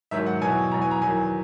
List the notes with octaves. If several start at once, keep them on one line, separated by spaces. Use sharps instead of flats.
G#2 D#3 F#3 E5
F#5
E2 B2 F#3 G#5
E2 B2 F#3 A#5
G#5
A#5
E2 D#3 F#3 G#5